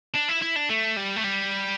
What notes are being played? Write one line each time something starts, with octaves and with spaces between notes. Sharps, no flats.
D4
E4
E4
D4
A3
G3
A3
G3